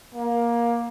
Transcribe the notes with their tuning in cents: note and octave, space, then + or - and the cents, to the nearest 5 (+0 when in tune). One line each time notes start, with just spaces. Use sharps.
A#3 +15